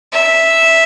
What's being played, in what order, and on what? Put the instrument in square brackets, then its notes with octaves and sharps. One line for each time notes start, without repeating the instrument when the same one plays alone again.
[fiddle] E5